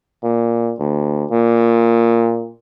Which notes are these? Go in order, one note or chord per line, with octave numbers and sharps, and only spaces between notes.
A#2
D2
A#2